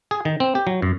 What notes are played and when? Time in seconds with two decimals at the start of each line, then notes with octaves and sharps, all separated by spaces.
0.11 G#4
0.25 D#3
0.40 C4
0.55 G4
0.67 F#3
0.82 F#2